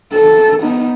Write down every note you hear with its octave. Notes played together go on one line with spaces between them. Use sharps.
A4
B3 D#4